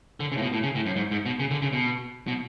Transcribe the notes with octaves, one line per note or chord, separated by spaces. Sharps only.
D3
C#3
A2
B2
A2
C#3
A2
F#2
G#2
G#2
B2
C#3
D3
C#3
B2
B2